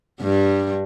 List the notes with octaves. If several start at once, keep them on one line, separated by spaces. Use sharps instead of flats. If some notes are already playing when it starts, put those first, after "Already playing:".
G2 G3